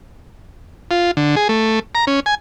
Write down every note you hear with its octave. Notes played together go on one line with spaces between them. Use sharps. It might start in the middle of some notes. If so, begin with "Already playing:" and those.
F4
D3
G#4
A3
A#5
C#4
G#5